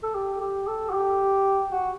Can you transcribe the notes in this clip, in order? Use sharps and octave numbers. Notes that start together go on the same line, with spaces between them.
A4
G4
G4
A4
F#4
G4
F#4